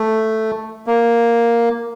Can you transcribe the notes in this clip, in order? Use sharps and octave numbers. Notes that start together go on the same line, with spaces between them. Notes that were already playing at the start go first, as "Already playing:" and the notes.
Already playing: A3
A#3